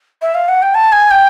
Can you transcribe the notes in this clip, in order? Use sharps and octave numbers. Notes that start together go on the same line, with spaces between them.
E5
F5
F#5
G5
A5
G#5
G5